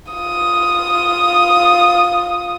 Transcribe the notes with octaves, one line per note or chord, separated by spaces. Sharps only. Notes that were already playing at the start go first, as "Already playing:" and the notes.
F4 D#6